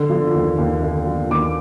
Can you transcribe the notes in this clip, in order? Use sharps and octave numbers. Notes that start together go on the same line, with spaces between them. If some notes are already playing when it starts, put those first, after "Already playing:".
Already playing: D3
F3
D#2
D#2
D3
F3
D#2 D6